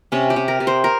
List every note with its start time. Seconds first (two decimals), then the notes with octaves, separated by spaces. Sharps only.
0.12 C3 C#4
0.30 G4
0.36 C3
0.48 A#4
0.60 C3
0.67 C5
0.84 A#4